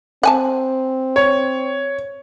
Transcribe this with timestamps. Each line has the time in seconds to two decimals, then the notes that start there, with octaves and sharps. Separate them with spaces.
0.23 C4 F#5 G#5 A5
1.16 C#5